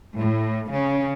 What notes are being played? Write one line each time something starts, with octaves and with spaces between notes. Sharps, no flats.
A2
C#3